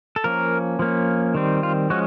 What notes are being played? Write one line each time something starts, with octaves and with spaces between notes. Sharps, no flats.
A4
F3 A#3 C#4 A#4
F3 A#3 C#4
D#3 G3 C4
F4
F3 G#3 C#4 F#4